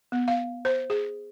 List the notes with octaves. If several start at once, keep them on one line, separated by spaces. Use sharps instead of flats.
B3
F5
C5
G#4